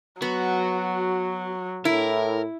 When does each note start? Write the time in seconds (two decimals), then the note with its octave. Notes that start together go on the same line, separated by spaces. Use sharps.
0.22 F#3 B3 F#4
1.85 A2 E4 A#4